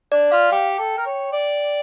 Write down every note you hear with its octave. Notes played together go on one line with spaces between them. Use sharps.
D4 D5
F4 F5
G4 G5
A4
A#4
C#5
D5